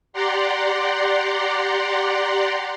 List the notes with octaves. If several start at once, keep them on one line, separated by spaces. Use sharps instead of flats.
G4 D5 F#5 A#5 C6